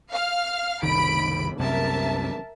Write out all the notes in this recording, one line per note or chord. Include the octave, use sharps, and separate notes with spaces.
F5 F6
F#1 C2 D#3 B5 D7
C2 F#2 C3 A#4 E5 A5